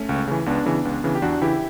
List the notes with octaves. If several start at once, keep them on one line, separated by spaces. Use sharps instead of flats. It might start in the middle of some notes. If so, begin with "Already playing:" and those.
Already playing: A3 C#4
C#2
C#3 E3
C#2 B3 D4
C#3 E3
C#2
C#3 E3
G4
E2 D4 F#4
C#3 E3 E4 G4